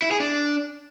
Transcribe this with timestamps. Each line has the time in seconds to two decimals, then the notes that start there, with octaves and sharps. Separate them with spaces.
0.02 E4
0.11 G#4
0.20 D4